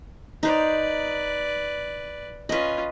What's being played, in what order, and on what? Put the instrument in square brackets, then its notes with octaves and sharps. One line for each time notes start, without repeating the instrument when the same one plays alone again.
[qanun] D#4 C5 [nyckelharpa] B4 D5
[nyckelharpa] C#4 F4 [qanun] B4 D#5